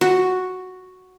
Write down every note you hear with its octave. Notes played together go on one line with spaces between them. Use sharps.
F#4